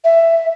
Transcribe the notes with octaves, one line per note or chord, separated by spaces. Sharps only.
E5